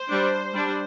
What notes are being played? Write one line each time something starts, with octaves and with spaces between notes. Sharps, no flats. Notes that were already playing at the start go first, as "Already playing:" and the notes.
Already playing: C5
G3 D4
G3 D4